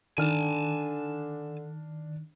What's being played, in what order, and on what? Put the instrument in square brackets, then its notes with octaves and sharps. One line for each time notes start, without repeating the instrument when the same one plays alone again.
[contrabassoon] D3 [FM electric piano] D#3 [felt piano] D4 F6 [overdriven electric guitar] G#5 A5